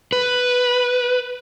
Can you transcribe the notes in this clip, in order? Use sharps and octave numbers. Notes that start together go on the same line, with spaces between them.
B4